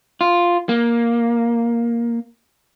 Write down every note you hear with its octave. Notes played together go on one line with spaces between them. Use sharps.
F4
A#3